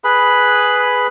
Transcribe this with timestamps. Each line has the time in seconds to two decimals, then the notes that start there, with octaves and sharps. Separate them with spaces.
0.04 G#4 B4 B5